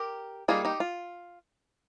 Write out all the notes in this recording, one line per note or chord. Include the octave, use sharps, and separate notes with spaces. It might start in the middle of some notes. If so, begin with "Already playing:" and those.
Already playing: G4 A#4
G3 A#3 D#4 F4 G#4
D#4 G4
F4